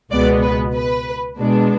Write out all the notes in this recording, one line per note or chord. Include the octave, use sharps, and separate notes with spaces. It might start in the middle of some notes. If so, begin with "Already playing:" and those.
C#2 B2 G#3 B3 D5
B4
B4
B2 G#3 B3 D4